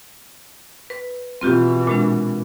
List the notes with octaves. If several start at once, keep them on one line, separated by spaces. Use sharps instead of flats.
B4
B2 E3 C4 F4 G4
A#2 G#3 D4